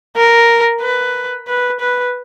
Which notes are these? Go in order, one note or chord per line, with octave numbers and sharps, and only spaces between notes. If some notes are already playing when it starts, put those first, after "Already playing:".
A#4
B4
B4
B4